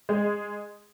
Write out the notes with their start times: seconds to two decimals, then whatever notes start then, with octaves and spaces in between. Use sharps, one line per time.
0.09 G#3